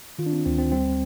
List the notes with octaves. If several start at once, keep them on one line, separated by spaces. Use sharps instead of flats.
D#3 F4
D4
C4
D2 C4
C4
G3 C4